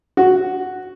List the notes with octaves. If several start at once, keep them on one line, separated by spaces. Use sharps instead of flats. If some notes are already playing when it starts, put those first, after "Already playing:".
F#4